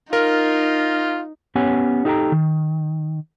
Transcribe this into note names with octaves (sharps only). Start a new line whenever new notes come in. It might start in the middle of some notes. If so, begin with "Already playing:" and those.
D#4 F4 A#4
B3 C#4 G4 C#5 F#5 G#5
D#4 G4 A4 F#5 G5 A#5
D#3